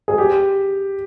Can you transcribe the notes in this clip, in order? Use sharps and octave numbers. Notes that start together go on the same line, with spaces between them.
G#4
G4